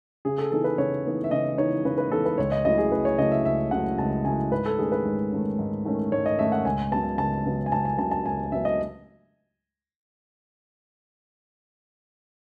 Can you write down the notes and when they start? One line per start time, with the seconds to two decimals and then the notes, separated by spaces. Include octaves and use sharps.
0.25 C#3 G#4
0.38 A4
0.51 E3 B3 D#4 A4
0.64 B4
0.78 C#3 C#5
1.05 E3 B3 D#4
1.24 E5
1.31 C#3 D#5
1.58 E3 B3 D#4 C#5
1.85 C#3 B4
1.98 B4
2.11 E3 B3 D#4 A4
2.26 B4
2.38 C#2 C#5
2.52 D#5
2.65 C#3 F#3 A3 E4 D#5
2.78 G#4
2.92 C#2 B4
3.05 C#5
3.18 C#3 F#3 A3 E4 D#5
3.32 E5
3.45 C#2 E5
3.71 C#3 F#3 A3 E4 F#5
3.98 C#2 A5
4.25 C#3 F#3 A3 E4 G#5
4.52 G#2 B4
4.66 A4
4.78 D#3 A3 C#4 G#4
4.92 B4
5.05 G#2
5.32 D#3 A3 C#4
5.59 G#2
5.85 D#3 A3 C#4
6.12 G#2 C#5
6.26 D#5
6.39 D#3 A3 C#4 E5
6.52 F#5
6.65 C#2 G#5
6.91 C#3 F#3 B3 A5
7.18 C#2 A5
7.45 C#3 F#3 B3
7.66 G#5
7.72 C#2 A5
7.85 G#5
7.98 C#3 F#3 B3 A5
8.11 A5
8.25 C#2 G#5
8.52 C#3 F#3 B3 E5
8.65 D#5